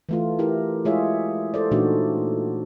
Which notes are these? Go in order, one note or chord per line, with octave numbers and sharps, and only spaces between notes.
E3 A3 F4
E4 G4 A#4 B4
G#3 E4 F4 G#4 C#5 E5
A4 C5 D5
A#2 E3 A3 D4 D#4 F#4